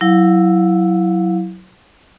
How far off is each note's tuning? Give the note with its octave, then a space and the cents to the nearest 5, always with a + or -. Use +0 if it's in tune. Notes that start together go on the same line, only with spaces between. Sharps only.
F#3 +0 E4 +0 F5 +25